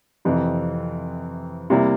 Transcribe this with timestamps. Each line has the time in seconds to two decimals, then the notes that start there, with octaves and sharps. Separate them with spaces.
0.25 F2 C3 E3
1.70 C3 G3 A#3 E4